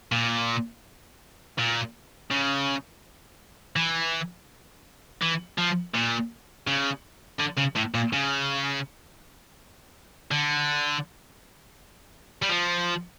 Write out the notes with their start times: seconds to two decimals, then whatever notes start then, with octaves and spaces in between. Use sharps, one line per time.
0.12 A#2
1.58 A#2
2.31 C#3
3.76 E3
5.22 E3
5.58 F3
5.94 A#2
6.67 C#3
7.40 D3
7.58 C#3
7.76 A2
7.94 A#2
8.13 C#3
10.31 D3
12.42 G3
12.49 F3